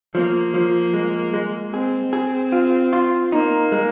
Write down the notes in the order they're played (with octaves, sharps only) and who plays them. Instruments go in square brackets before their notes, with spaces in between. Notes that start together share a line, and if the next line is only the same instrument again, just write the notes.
[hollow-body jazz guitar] F3 [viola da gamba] A#3
[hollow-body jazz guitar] F3
G#3
G#3
[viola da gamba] C4 [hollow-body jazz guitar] G#4
[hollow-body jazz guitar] G#4
F4
F4
[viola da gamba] A#3 [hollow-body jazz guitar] D#4
[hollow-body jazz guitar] G#3